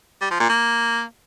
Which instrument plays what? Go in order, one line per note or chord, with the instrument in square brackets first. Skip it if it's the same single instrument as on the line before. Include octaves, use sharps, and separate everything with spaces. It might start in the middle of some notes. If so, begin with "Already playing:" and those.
[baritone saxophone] G3
F3
A#2
A#3